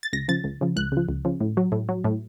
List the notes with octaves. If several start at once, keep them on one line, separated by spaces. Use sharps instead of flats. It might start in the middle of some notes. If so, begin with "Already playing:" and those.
A6
C#2 A#6
C#3 F3 A6
C#2
C#3 F3
C#2 F#6
C#3 F3
C#2
C#3 F3
A2
F#3
A2
F#3
A2